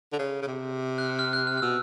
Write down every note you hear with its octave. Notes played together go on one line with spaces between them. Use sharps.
D3
C#3
C#3
C3
F#6
F6
F6
F#6
F6
F6
B2 E6